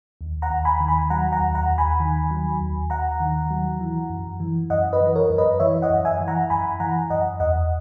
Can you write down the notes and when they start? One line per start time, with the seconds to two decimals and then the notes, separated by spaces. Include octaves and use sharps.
0.21 D#2
0.42 F#5 A#5
0.50 D#2
0.65 G#5 B5
0.80 D#3
0.88 G#5 B5
1.10 F#3 F#5 A#5
1.32 F#5 A#5
1.40 D#2
1.55 F#5 A#5
1.70 D#2
1.78 G#5 B5
2.00 D#3
2.31 F#3
2.61 D#2
2.90 D#2 F#5 A#5
3.20 D#3
3.50 F#3
3.80 E3
4.10 F#2
4.40 E3
4.70 F#2 D#5 F#5
4.93 B4 D#5
5.00 E3
5.15 A#4 C#5
5.30 F#2
5.38 B4 D#5
5.60 E3 C#5 E5
5.82 D#5 F#5
5.90 F#2
6.05 E5 G#5
6.21 E3
6.28 F#5 A#5
6.50 F#2 G#5 B5
6.80 E3 F#5 A#5
7.10 F#2 D#5 F#5
7.40 E2 D#5 F#5